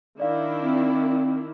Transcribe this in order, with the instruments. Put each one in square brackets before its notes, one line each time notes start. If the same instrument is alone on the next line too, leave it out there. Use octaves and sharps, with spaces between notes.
[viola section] D#3 D4 E4 [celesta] D5 F5
[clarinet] C4